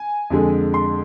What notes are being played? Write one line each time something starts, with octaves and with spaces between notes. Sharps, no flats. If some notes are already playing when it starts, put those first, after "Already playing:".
Already playing: G#5
F2 D3 G#3
C6